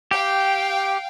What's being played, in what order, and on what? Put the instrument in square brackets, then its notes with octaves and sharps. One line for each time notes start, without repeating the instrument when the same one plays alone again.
[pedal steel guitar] G4 [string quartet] F5 G5